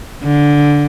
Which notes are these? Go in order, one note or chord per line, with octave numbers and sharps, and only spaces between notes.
D3